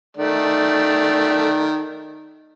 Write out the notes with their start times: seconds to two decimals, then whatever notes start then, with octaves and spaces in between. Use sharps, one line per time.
0.17 D#3 A3 D5